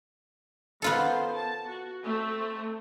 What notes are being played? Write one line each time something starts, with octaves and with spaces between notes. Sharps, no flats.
D#3 B3 F4 A4 C5
A5
F#4
A3 C4